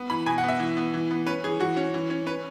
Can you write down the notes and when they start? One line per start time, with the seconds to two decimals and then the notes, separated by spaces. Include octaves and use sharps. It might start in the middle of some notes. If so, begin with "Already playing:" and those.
Already playing: B3
0.10 E3 B5
0.26 B2 G#5
0.38 F#5
0.44 B3 E5
0.60 E3
0.77 B3
0.94 E3
1.11 B3
1.26 C#4 B4
1.44 E3 G#4
1.60 E3 F#4
1.77 C#4
1.94 E3
2.10 C#4
2.26 C#4 B4